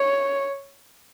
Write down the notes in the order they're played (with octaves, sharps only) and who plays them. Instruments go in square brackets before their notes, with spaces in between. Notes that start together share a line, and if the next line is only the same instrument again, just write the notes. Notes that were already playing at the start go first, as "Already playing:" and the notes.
Already playing: [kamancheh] C#5